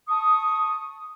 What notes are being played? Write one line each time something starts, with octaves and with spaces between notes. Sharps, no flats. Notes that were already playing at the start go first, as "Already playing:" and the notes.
A5 C#6 D#6